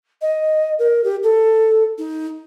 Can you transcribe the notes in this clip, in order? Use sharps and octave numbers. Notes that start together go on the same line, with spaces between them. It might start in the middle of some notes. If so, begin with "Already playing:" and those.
D#5
A#4
G4
A4
D#4